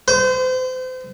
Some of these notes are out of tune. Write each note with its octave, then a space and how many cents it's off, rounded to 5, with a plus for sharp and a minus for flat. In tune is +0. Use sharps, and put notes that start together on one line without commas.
C5 -35